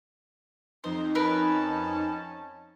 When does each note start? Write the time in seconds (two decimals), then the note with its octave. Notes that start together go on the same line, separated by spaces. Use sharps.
0.84 F2 D#4 C5
1.15 C#4 A#4 B4 A5